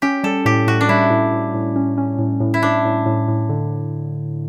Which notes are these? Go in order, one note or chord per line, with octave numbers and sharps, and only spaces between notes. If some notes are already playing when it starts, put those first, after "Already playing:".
C#4 G4
G3 A4
A2 G4
A2 F#4
D4
G3 E4
A2
A2
A2
C#4
C#4
A2
A2
E4
A2 D4
A2
A2
A2
D3